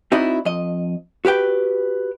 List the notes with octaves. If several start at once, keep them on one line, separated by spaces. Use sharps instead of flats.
C4 D#4 E4 F#4 D5 D#5
F2 D#5
F#4 G4 B4 G5